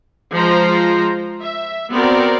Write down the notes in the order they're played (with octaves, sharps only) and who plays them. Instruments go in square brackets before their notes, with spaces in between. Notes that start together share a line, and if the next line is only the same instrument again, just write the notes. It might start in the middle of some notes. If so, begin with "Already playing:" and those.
[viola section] F3 G#3 F4 C5 A#5
E5
B3 C4 F#4 A#4 D5